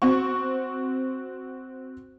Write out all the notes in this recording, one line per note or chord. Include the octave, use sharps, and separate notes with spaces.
C4 F#4 C#6